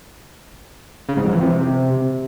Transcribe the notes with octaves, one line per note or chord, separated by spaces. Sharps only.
C#3
G#2
F2
E2
C3